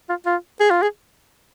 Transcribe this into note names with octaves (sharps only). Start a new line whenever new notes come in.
F4
F4
G#4
F4
G#4